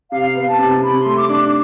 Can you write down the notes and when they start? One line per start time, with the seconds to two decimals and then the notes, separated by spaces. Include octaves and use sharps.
0.11 C3 F5
0.35 B3
0.48 A5
0.59 C3
0.82 C3 B5
1.00 C6
1.06 A3
1.17 D6
1.29 D4
1.35 D6